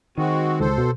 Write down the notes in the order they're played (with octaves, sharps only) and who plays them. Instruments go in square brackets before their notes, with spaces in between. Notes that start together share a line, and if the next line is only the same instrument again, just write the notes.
[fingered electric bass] D#3 [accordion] G#3 C4 F#4
[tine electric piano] C#2 [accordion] A4 C5
[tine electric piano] B2